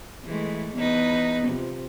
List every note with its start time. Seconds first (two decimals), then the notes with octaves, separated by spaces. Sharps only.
0.25 E3 G#3 A3
0.74 E2 D#4 B4
1.46 C3 F3